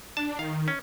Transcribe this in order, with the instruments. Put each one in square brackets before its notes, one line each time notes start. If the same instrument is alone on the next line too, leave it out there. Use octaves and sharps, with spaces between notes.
[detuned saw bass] D4 [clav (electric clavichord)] A5
[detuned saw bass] D#3 [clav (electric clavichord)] F5
[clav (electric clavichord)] C#4